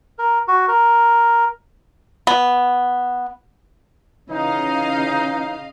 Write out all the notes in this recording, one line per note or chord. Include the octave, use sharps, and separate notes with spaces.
A#4
F#4
A#4
B3
C#3 E3 C#4 D#4 D#5 F5